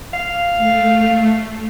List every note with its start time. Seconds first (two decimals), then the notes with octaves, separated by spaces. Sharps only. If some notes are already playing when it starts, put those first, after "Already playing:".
0.13 F5
0.57 A3